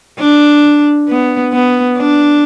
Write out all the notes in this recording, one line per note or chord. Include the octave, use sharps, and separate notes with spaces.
D4
B3
B3
D4